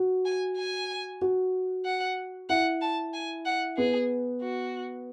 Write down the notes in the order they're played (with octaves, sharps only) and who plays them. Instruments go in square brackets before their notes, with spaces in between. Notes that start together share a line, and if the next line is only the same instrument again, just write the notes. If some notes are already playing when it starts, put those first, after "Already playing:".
Already playing: [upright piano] F#4
[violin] G#5
G#5
[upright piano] F#4
[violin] F#5
[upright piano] E4 [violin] F#5
[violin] A5
G#5
F#5
[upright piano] B3 [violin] G#4
[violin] F#4